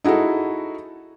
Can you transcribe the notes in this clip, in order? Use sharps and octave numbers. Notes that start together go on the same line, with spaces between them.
D#4 E4 F#4 G#4 A4